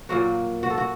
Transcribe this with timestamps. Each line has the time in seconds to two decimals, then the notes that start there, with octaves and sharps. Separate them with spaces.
0.09 A#2 F#3 A#3 F#4
0.63 F#4
0.70 A4
0.78 F#4